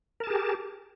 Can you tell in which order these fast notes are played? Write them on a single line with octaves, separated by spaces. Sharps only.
A#4 A5 G#4 G4